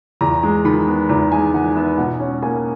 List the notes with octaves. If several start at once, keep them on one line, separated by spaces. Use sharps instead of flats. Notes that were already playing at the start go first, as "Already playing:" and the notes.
E2 A#5
G#3
D#3 B5
B3
E2 A#5
G#3 G#5
D#3 F#5
B3 E5
B2 F#5
C#4
A#3 G#5